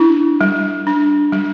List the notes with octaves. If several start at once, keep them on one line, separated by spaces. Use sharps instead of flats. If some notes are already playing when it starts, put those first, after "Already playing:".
Already playing: D4 E4
G3
D4
G3